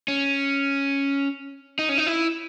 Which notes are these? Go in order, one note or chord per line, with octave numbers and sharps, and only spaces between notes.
C#4
D#4
C#4
D#4
E4